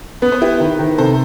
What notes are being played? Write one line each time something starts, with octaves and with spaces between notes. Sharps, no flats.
B3 B4
C5
E4 G4 B4
D#3
D#3
C3 A4 C5